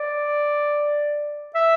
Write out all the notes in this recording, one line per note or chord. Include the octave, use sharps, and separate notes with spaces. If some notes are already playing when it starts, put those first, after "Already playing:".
Already playing: D5
E5